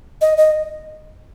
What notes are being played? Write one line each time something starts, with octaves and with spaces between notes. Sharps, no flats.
D#5
D#5